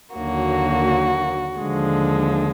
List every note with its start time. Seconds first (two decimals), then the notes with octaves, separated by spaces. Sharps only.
0.14 D#2 D3 F#3 A#3 F#4
1.59 D#2 D3 F3 G#3